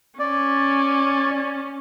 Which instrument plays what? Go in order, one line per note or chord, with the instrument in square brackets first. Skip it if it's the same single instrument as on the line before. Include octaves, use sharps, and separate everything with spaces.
[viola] C#4 [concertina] D5